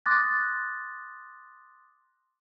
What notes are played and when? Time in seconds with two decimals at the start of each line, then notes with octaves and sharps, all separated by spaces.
0.06 C6 D6 D#6 F#6 A6 A#6